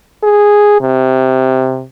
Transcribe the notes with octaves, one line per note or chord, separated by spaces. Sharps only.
G#4
C3